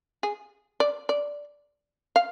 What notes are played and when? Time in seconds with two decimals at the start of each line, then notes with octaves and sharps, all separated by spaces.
0.23 G#4
0.80 D5
1.09 D5
2.16 F5